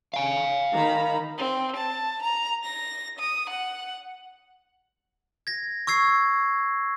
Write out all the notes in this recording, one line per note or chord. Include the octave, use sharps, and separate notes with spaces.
F5 G#5
D#3 A#5 B5
C4
A5
A#5
A#6
D#6
F#5
G#6 A#6
C#6 E6 G#6 C7